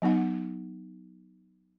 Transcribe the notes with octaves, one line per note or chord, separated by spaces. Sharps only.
F#3 B3 D#4 F#5